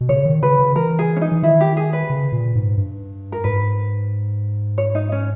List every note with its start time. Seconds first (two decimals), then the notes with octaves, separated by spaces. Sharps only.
0.01 B2
0.09 C#3 C#5
0.26 D#3
0.42 C#3 B4
0.59 C#3
0.76 E3 A#4
0.99 G#4
1.16 C#4
1.21 D#4
1.32 E3
1.43 D#3 E4
1.61 G4
1.77 G#4
1.93 B4
2.10 C#3
2.32 A#2
2.55 G#2
2.77 G2
3.32 A#4
3.44 G#2 B4
4.78 C#5
4.95 D#4
5.12 C#4